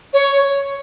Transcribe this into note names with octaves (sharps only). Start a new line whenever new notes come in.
C#5